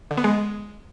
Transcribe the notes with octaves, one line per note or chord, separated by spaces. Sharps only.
D3
B3
G#3